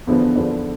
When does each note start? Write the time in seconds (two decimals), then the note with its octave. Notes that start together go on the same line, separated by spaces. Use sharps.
0.07 E2 D3 F3 B3 D4
0.36 E2 D3 F3 B3 D4